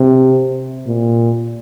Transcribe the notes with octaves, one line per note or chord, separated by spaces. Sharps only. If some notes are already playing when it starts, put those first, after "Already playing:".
Already playing: C3
A#2